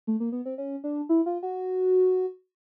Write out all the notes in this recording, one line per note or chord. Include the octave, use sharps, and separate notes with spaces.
A3
A#3
B3
C4
C#4
D4
E4
F4
F#4